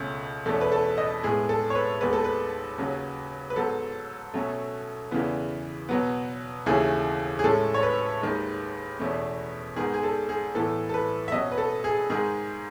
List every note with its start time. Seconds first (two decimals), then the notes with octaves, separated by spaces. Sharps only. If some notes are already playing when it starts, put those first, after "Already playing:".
Already playing: C#2 B2 A3 C#4
0.46 E2 B2 A3 C#4 A4
0.61 B4
0.72 A4
0.98 D#5
1.24 A2 G#3 B3 G#4
1.49 A4
1.70 C#5
1.75 B4
2.00 D#2 D#3 G#3 B3 B4
2.13 A4
2.24 B4
2.78 D#2 C#3 F#3 C#4
3.50 B4
3.56 G#2 F#3 B3 A4
4.34 B2 F#3 A3 C#4
5.11 E2 C#3 E3 B3
5.89 B2 F#3 B3
6.66 D#2 C#3 E3 A3 C#4 G#4
7.39 G#4
7.44 A2 G#3 C#4 A4
7.74 C#5
7.83 B4
8.22 D#2 D#3 G#3
8.99 E2 B2 A3 C#4
9.76 G#2 D#3 G#3 B3 G#4
9.94 G#4
10.03 A4
10.29 G#4
10.54 A2 E3 B3 A4
10.89 A4
10.94 B4
11.28 E5
11.32 B2 F#3 C#4 D#5
11.52 B4
11.58 A4
11.84 G#4
12.10 G#2 D#3 G#3 G#4